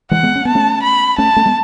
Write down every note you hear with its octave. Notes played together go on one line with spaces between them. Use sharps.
E3 G#3 F#5
G#3 B3
C#4
B3 A5
A3 C#4
B5
A3 C#4 A5
A3 C#4
G#3 B3